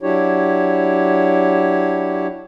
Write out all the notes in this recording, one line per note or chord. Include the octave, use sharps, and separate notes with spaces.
F#3 D4 E4 G4 C#5